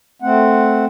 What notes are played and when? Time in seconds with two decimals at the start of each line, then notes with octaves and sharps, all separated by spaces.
0.22 A3 C4 F#5